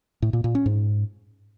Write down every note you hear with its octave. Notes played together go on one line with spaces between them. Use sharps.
A2
A#2
A#2
C#4
G#2